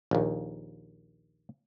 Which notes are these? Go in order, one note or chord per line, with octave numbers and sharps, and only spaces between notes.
A#1 D#2